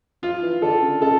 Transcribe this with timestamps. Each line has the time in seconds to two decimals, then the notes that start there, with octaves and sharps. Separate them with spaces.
0.23 F3 F4
0.42 E3
0.62 D3 A4
0.82 C#3
1.02 C#3 A4